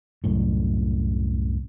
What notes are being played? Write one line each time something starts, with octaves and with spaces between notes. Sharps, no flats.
C2 F#2 A2